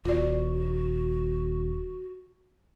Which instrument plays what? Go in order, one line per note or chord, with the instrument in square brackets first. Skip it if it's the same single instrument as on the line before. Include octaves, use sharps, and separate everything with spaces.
[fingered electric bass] D#1 [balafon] F4 D5 [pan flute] F#4